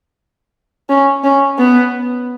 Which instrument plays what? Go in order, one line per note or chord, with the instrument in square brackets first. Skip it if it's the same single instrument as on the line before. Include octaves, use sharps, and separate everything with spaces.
[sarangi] C#4
C#4
B3